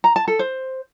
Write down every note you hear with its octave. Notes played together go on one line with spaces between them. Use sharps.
A#5
A5
A4
C5